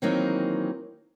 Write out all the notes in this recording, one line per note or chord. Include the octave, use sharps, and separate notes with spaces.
D#3 E3 F#3 A#3 C4 D#4